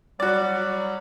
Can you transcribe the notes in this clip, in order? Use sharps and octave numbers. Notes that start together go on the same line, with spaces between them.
F#3 G3 F#4 D5